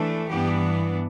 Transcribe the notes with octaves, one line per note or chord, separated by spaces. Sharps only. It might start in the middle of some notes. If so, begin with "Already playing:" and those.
Already playing: E3 A3 D4
G2 E3 B3 D4 G4